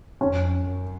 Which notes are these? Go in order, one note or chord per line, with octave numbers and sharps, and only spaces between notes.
F2 C#4
F#2